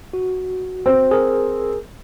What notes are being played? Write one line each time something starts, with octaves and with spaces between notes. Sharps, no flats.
F#4
C4
G#4 A#4